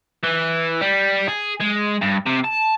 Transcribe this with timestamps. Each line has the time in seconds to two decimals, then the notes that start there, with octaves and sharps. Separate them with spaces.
0.23 E3
0.81 G3
1.28 G#4
1.60 G#3
2.01 G2
2.26 C3
2.44 A5